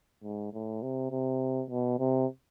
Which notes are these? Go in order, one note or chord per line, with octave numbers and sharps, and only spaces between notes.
G#2
A2
C3
C3
B2
C3